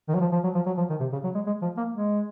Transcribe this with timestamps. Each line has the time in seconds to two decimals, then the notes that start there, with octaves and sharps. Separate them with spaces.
0.09 D#3
0.15 F#3
0.21 F3
0.32 F3
0.44 F#3
0.55 F3
0.66 F#3
0.78 F3
0.90 D#3
1.00 C3
1.13 C#3
1.24 F#3
1.35 G#3
1.47 G#3
1.62 F3
1.77 A#3
1.92 G#3